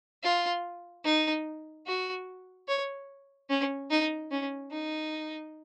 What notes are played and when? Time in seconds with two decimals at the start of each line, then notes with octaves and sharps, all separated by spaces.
0.23 F4
1.05 D#4
1.87 F#4
2.68 C#5
3.50 C#4
3.91 D#4
4.31 C#4
4.72 D#4